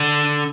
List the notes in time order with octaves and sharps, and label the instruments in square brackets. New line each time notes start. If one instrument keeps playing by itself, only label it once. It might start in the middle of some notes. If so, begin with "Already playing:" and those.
Already playing: [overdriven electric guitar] D3